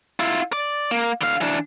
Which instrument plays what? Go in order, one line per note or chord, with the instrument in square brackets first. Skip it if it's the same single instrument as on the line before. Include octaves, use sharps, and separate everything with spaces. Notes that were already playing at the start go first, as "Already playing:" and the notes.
[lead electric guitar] E4 F4
D5
A#3
D3 F5
E3 D4